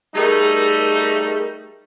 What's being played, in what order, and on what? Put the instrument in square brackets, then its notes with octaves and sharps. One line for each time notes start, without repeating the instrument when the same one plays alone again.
[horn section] G3 A3 D#4 [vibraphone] G#4 A#4